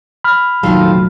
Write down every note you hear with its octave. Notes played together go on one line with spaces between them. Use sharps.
B5 F6
F1 A#1 D#3 F#3 F4 A4